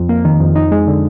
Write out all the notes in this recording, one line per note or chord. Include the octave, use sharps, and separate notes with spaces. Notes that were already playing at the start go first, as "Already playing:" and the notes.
Already playing: F2
A#3
D#3
F2
D#4
G#3
D3